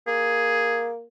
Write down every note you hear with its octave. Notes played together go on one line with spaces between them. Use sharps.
A#3 G#4